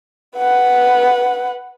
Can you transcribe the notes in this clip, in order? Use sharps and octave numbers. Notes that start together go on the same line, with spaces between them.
B4 F#5